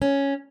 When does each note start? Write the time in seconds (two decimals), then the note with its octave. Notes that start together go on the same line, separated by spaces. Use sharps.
0.02 C#4